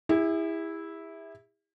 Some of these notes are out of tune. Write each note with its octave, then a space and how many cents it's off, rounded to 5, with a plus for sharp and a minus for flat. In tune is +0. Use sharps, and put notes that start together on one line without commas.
E4 -5 G#4 -45